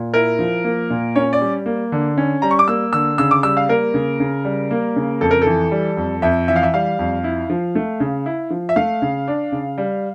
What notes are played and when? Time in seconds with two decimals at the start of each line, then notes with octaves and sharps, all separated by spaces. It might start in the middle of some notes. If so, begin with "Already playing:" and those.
Already playing: A#2
0.14 E4 A#4
0.39 F3
0.64 A#3
0.90 A#2
1.15 C#4 C#5
1.33 D5
1.41 G3
1.66 A#3
1.92 D3
2.18 C#4
2.42 G3 A#5
2.51 C#6
2.59 D6
2.68 A#3 E6
2.93 D3 E6
3.18 C#3 E6
3.31 D6
3.43 G3 E6
3.57 F5
3.69 A#3 A#4
3.94 C#3
4.20 C#3
4.45 G3
4.71 A#3
4.96 C#3
5.21 F2 A4
5.31 A#4
5.42 E3 A4
5.71 G3
5.97 F2
6.22 F2 E5
6.48 E3 E5
6.56 F5
6.63 E5
6.74 G3 F5
6.99 F2
7.24 E4
7.50 F3
7.75 A3
8.00 C#3
8.26 E4
8.51 F3
8.69 E5
8.76 A3 F5
9.02 C#3
9.28 D4
9.52 C#3
9.78 G3